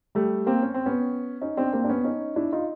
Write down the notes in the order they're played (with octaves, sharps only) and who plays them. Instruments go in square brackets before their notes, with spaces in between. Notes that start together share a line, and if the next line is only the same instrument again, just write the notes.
[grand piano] G3 A3
A#3 C4
C#4
C4
B3 C#4
C#4 D#4
C4 D4
A#3 C4
D4
B3 C#4
C#4 D#4
D4 E4
D#4 F4